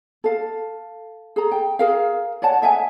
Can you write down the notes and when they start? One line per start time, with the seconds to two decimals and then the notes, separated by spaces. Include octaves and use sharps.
0.24 A4 F5
1.36 G#4 A4 A#5
1.51 G5
1.79 G#4 A#4 F5
2.42 C#5 D5 F#5 A5
2.62 D#5 E5 F#5 G#5